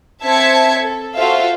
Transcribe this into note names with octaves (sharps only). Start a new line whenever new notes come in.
C4 E5 A5 G#6 B6 C#7
A4
F4 F#4 A4 C5 E5 F5